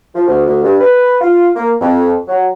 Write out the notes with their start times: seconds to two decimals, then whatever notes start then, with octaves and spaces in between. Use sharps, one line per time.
0.15 F3
0.26 D2
0.46 D2
0.63 G2
0.80 B4
1.21 F4
1.56 A#3
1.81 F2
2.27 F#3